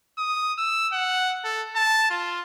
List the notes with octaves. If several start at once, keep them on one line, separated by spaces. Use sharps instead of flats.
D#6
E6
F#5
A4
A5
F4